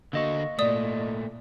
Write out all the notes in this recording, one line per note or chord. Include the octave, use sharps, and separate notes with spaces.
D3 A#3 F#4 D#5 C#6
A#2 A3 D5 D#6